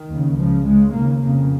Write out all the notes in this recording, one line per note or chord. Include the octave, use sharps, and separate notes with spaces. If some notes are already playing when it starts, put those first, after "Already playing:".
Already playing: D#3
D#2 C#3
C#2 C#3 F3
C#2 C#3 G#3
D#2 C#3 A#3
F2 C#3 A#3